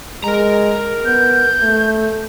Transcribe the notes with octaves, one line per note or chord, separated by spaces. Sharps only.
G#3 A#4 A#5
B3 G6
A3